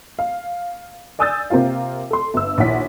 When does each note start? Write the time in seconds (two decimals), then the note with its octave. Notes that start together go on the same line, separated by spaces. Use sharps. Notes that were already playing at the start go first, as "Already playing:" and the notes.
0.19 F5
1.19 D5 G#5 D#6 E6 G6 A6
1.50 C3 A#3 C4 F4 F5
2.11 A4 C6
2.34 G1 E6
2.58 A#1 D#2 E4 C#5 F#5 B6